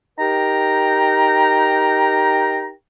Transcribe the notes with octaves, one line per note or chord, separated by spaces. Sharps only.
D#4 G4 A#4 G5 A#5